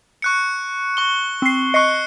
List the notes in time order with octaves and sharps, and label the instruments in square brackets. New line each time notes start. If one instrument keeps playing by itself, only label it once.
[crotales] C#6 F#6 C#7
C#6 G7
[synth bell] C4 C7
[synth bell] D#5 C#6 [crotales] F#6 C7 C#7